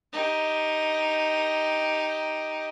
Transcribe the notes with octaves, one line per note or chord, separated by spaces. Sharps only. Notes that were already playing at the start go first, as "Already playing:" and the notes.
D#4 G4